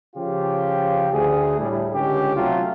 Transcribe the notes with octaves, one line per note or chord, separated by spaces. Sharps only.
C#3 F3 F4 G4
D2 G#4
A2 G3
C#2 D3 C#4 G4
C3 F#3 A3 F4